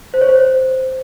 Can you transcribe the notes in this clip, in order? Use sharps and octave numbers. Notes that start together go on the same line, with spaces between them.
C5
C#5
C5